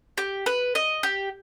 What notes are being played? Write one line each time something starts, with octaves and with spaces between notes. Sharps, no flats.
G4
B4
D#5
G4